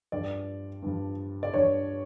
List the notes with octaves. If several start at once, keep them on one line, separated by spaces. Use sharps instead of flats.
G2 F3 D5
G2 F3
D5
G2 F3 C#5